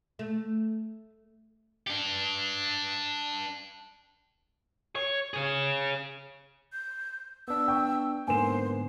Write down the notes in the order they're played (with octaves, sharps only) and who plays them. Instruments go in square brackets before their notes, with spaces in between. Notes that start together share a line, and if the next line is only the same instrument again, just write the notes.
[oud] A3
[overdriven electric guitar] D4 G4
C#5
G#4 C#5
[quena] G6
[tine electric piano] B3 D4 [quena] E6
[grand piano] G5 C#6
[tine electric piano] G#2 D3 B3 [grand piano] A#3 E7 [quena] C5 [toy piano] G#5 C6